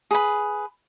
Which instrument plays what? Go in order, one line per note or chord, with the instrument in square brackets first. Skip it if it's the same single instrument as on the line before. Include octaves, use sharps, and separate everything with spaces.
[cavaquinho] G#4 B4 B5